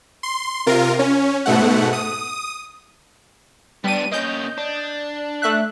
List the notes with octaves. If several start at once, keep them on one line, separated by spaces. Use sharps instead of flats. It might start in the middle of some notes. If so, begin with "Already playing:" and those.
C6
C3 F4 A#4
C#4
G#2 B2 A3 F#5
D#6
G3 B3 D4 D#7
A#3 C#4 D#5 G6
D4
A3 E5 F#6